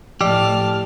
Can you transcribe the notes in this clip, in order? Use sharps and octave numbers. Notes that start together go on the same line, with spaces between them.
A2 F3 G4 D5 A5 F6